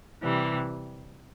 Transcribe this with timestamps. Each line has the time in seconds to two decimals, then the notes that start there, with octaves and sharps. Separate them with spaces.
0.22 C3 E3 G3